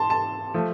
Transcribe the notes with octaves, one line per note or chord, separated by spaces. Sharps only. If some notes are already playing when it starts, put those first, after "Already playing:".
Already playing: A5 C6
A5
F3 A3